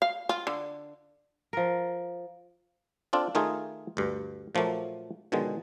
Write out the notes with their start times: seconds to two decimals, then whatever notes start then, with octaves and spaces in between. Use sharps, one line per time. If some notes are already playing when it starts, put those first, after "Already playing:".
0.02 F5
0.29 F4
0.47 D3
1.53 F3 A#4
3.13 C4 D4 F4 A4
3.35 D#3 A3 D#4 F4 G#4
3.97 D2 G2
4.55 A#2 F3 F#3 A3 A#3
5.32 B2 D3 D#3 F3 G#3